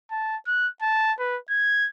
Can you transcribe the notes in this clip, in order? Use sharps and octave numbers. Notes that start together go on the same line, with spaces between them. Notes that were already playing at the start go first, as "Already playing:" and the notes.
A5
F#6
A5
B4
G#6